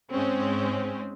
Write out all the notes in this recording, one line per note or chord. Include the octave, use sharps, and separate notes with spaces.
G#2 G#3 C4 C#4